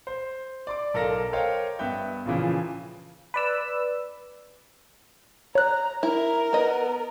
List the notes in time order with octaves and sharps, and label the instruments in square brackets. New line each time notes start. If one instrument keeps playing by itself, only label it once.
[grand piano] C5
D5 C6 D6
B1 A4 A#4 F5 A#6
A#4 C5 C#5 D#5 F5 G5
G2 B3 E5 G5 G6
A#2 C#3 E3 F3
[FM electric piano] B4 D5 E6
[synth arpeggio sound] C#5 F#6 [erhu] A#5
[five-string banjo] E4 [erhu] A#4
[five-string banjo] B3 D#5